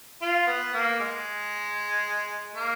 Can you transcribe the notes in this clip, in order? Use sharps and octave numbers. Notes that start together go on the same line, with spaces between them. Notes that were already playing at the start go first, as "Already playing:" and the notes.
F4
B3
A#3
G#3
A#3